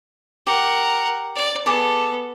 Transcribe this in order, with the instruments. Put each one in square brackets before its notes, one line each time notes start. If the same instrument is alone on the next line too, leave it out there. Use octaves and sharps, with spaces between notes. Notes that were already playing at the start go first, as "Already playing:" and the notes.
[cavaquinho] G4 [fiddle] A#4 F#5
[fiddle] D5
[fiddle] B3 A4 [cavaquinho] G#4 D5 A5